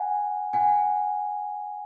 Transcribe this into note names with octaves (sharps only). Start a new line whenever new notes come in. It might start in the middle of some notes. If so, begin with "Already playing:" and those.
Already playing: F#5 G#5
F#5 G#5